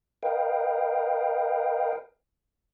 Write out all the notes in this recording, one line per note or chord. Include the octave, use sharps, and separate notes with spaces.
A#4 B4 D#5 F5 G5